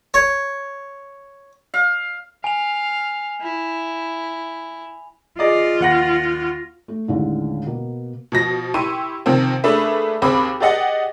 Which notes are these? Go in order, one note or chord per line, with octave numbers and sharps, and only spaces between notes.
C#5
F5
F5 G#5 F7
E4
F4 G#4 D5 D#5
D#2 F#5 A#6
A3
D#2 A2 D3 G#3 C#4
B2 A#3
B2 F3 A#6
E4 G4 C6 C#6 D#7
C3 D#3 F3 A#3 C4
A3 A#3 D4 G#4 B4 E5
D#2 C4 G#4 B5 D6
G4 G#4 D5 D#5 F#5